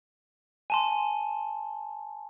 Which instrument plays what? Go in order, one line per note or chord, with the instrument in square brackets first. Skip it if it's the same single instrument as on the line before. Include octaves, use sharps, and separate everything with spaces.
[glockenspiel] G#5 A5 C6